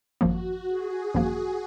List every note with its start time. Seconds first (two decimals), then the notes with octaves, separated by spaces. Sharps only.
0.21 G#1 F#2 F3 A#3 F#4
0.68 G#4
1.14 G#1 F#2 F3 A#3 F#4